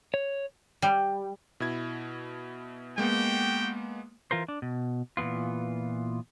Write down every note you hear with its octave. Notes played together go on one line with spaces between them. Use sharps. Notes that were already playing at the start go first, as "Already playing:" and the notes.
C#5
G3
B2 E4 G#6
G#3 A#3 B3 F#4 G4 G5
E3 F4 A#4 C5
D4
B2
A#2 E3 G3 B3 F4